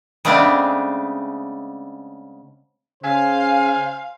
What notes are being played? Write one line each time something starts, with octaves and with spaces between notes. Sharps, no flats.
C#3 G#3 A3 B3 C4 D4
C#3 C5 F5 G#5